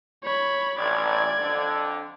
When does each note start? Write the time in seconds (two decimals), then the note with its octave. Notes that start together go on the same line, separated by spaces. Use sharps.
0.23 C#5 B5
0.78 A1 D5 G#6
1.38 F2 D3